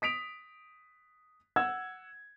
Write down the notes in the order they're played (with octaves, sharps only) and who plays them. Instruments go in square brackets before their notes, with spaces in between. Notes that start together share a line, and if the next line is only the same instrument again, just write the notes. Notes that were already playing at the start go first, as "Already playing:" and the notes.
[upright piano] D#6 B6 D7 F7
F#5 E6 G#6